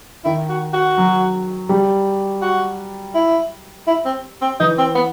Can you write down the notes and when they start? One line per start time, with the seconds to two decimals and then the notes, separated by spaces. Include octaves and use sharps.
0.25 D#3 E4
0.50 F#4
0.74 F#4
0.97 F#3
1.69 G3
2.42 F#4
3.15 E4
3.88 E4
4.05 C4
4.42 C4
4.60 E3 D#4
4.78 C4
4.95 B3